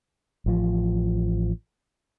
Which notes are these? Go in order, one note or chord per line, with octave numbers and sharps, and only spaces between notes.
A1 F3